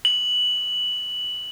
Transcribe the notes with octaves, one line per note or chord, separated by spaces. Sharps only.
F#7